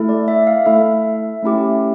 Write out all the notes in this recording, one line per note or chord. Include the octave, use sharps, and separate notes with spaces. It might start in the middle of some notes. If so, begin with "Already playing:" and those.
Already playing: A3 E4 A4
D5
E5
F5
A3 E4 A4 E5
A3 C#4 E4 G4